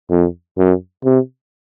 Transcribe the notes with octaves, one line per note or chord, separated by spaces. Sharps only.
F2
F#2
C3